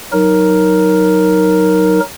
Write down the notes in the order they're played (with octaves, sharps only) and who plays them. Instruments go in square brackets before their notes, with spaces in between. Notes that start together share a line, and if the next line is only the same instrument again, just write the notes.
[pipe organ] F#3 D#4 A#4